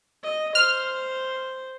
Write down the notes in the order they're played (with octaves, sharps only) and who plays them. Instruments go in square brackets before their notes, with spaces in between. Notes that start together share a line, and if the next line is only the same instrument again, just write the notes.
[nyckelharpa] D#5
[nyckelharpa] C5 [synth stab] F6